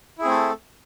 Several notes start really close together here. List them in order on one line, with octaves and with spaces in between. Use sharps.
E4 G#4 C4 A3 A4